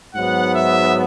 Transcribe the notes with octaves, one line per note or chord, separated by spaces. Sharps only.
G#2 F#3 B3 F#5
E5